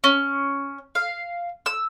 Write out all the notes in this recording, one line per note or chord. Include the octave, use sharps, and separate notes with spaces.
C#4
F5
E6